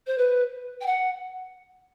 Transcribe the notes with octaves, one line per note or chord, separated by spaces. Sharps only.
C5
B4
G5
F#5